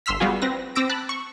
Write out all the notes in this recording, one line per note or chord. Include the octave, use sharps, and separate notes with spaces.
G1 C6 E6 F6 B6
G3 B3 F4 F#4 G#4
C4 B4 A#6
C4 D6 E6 A#6 D7
A5 B5 F#6
C#6